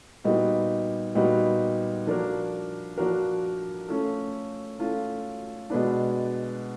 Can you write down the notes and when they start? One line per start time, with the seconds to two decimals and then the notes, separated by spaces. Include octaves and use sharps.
0.24 A#2 G3 B3 D#4 F#4
1.15 A#2 G3 B3 D#4 F#4
2.07 F3 A#3 D4 F#4 A#4
2.98 F3 A#3 D4 F#4 A#4
3.88 A3 C#4 F4 A4
4.79 A3 C#4 F4 A4
5.70 B2 G#3 B3 D4